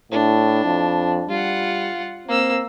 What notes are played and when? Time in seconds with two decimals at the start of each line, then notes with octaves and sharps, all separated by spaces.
0.12 A2 D4
0.65 F2
1.29 G3 F4 F#5
2.28 A#3 C4 E6